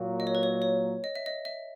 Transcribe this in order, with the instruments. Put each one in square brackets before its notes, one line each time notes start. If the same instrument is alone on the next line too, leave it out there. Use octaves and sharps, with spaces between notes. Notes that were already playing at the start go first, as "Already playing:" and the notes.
Already playing: [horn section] A#2 F#3 A#3
[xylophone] D#5
C#5
B4
C#5
C#5
D#5
E5
D#5
E5